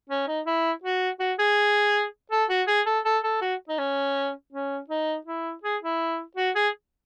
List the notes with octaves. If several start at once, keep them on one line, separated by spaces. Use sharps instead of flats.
C#4
D#4
E4
F#4
F#4
G#4
A4
F#4
G#4
A4
A4
A4
F#4
D#4
C#4
C#4
D#4
E4
G#4
E4
F#4
G#4